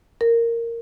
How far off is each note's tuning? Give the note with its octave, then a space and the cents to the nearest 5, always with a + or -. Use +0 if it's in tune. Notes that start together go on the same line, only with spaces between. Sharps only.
A#4 -10